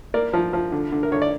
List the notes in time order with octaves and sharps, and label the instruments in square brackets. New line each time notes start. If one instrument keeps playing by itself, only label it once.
[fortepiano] A#3 A#4 D5
F3
F3
D3
D3
A#4
D3 C#5
D5